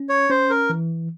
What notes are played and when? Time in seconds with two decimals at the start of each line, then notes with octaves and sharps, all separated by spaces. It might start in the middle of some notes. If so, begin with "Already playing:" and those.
Already playing: C#4
0.09 C#5
0.30 C#4 C5
0.50 A#4
0.70 E3